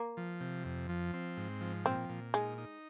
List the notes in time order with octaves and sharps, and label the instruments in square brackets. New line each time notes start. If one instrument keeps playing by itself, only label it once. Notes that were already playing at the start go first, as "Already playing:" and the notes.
Already playing: [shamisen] A#3
[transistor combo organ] F3
C3
F2
F3
C4
G#2
F3
[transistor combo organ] A#2 [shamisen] C4
[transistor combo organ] A#2
[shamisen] G#3 [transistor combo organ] D#4
[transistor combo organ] D#4